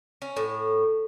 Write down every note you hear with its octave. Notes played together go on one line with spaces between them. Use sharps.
C#4
A2